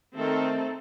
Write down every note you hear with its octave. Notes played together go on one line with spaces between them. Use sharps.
D#3 A3 C4 D#4 A4